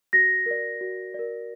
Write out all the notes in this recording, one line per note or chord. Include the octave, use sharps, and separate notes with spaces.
F#4 A#6
A#4 D5
F#4
A#4 D5